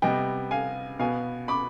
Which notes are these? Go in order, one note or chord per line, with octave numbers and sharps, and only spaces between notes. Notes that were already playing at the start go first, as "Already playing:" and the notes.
C3 G3 B3 D#5 G5
F5 G#5
B2 B3 F5 G#5
B5 D6